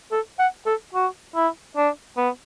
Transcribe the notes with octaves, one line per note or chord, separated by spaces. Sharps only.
A4
F#5
A4
F#4
E4
D4
B3